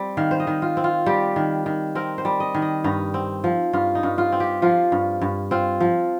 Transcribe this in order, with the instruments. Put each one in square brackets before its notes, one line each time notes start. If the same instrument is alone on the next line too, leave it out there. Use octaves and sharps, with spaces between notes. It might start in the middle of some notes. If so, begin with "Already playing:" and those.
Already playing: [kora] G3 C4
D#3 F5
C5
D#5
D#3
F4
C4
F4
G3 G4
D#3
D#3
C4 A#4
C5
G3
D#5
D#3
D#5
G2 D#4
C4
F3
G2 F4
D#4
G2
F4
C4
G4
F3 F4
G2
G2
C4 F4
F3